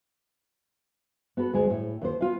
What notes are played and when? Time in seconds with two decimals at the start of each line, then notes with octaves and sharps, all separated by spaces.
1.37 B3 F#4 A4 B4
1.53 D2 G#3 G#4
1.70 A2
2.02 D#2 C5
2.21 B3 F4 F5